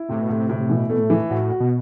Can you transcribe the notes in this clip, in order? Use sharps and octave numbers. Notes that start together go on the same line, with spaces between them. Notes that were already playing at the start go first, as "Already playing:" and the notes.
Already playing: E4
A2 C3
B2
A2 C3
A2
C3
B2 E3
B2 A3
A2
E3
A2 F#4
F#4
B2